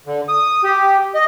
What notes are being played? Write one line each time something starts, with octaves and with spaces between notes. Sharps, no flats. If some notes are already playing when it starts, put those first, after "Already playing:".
D3
D#6
G4
D#5